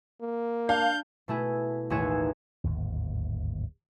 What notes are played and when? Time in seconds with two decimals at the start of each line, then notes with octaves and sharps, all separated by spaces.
0.21 A#3
0.69 D4 F5 G6
1.28 B2 A3 E4 G#4
1.90 A1 D#2 E4 G#4 C#5 E7
2.64 D1 G#1 D#2